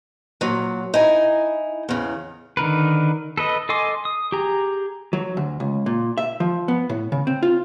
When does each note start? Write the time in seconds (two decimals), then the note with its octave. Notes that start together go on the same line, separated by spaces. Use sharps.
0.41 A#2 F#3
0.94 D#4 E4 G#5
1.89 E2 C#3
2.57 D3 D#3 A#4 B4
3.37 A4 B4 D#5
3.69 A4 D#5 G#5 C6 D6
4.05 D#6
4.32 G4 G#4 A#5
5.13 F#3
5.37 D2
5.60 C#2
5.86 A#2
6.18 E5
6.40 F3
6.68 B3
6.89 A2
7.12 C#3
7.27 C4
7.43 F4